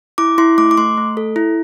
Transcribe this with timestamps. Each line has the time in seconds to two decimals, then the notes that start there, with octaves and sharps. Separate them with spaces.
0.18 E4 D6
0.38 E4 C6
0.58 A3 D6
0.71 D6
0.78 A3 C6
0.97 A3
1.17 A4
1.36 E4